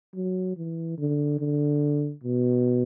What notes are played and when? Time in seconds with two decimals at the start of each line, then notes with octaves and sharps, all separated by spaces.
0.15 F#3
0.57 E3
0.98 D3
1.39 D3
2.23 B2